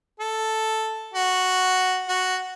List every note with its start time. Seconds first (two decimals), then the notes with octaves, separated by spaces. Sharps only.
0.20 A4
1.14 F#4
2.09 F#4